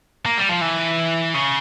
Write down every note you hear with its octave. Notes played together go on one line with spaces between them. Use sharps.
A#3
G3
F3
E3
C#3